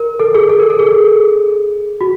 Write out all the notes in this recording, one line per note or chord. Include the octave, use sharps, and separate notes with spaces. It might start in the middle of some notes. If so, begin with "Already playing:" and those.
Already playing: A#4
A4
G#4
A4
A#4
A4
G#4
F#4